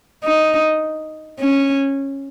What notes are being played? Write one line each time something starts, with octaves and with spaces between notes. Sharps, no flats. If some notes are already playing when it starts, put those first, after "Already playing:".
D#4
C#4